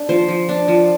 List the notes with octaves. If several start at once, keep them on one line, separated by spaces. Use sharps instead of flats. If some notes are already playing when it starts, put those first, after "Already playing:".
Already playing: D4
F3 C5
F3
D4
F3